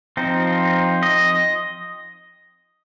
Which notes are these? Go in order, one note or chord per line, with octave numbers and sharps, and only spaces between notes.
F3 C4 D#4
D#5